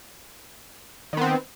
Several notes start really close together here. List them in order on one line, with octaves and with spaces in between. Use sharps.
D#3 B3 C4